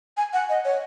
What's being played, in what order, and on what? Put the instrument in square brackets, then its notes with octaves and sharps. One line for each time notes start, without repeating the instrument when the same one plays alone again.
[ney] G#5
F#5
D#5
C#5